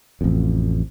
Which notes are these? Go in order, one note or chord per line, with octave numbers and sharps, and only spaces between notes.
A1 F2